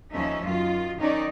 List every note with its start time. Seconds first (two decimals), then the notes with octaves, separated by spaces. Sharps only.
0.13 D#2 F3 C#4 D#4 E5
0.43 F#2 D#3 F4
0.98 D#3 C#4 D#4 D5